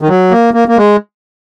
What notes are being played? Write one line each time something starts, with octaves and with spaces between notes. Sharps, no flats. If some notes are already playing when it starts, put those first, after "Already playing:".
D#3
F#3
A#3
A#3
A#3
G#3